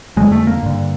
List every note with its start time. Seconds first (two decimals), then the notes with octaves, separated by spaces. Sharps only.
0.17 F2 D3 G#3
0.32 A3
0.47 A#3
0.63 G2 D3